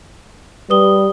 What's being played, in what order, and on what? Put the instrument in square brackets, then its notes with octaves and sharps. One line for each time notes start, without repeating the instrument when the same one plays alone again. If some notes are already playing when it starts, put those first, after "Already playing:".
[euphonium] G3 [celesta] B4 D#6 G7